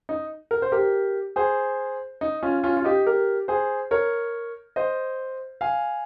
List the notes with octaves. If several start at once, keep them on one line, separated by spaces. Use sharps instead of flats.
D#4
A#4
C5
G4 A#4
G#4 C5
D#4
C#4 F4
C#4 F4
F4
D#4 G4
G4 A#4
G#4 C5
A#4 C#5
C5 D#5
F5 G#5